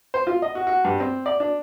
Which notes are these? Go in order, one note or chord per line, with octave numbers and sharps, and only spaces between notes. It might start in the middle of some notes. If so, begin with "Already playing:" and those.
C5
F4
D#5
F#4
F#4
G2
C4
D5
D4